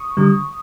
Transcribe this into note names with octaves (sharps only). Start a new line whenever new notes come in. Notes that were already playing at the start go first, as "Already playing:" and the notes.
Already playing: C#6 D#6
D3 G3